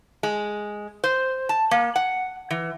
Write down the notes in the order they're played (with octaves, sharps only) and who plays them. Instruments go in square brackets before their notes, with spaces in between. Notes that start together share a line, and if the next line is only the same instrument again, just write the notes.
[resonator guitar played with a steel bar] G#3
C5
A5
A#3
F#5
E3